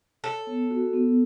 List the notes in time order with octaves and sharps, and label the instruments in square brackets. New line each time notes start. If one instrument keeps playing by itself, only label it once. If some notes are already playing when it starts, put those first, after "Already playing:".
[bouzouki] A4 [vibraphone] C#5
[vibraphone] B3
F#4
B3